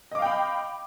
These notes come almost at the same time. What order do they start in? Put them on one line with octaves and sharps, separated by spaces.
D#5 D6 F5 G5 B5